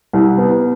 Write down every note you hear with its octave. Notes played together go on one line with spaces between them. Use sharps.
C2
B3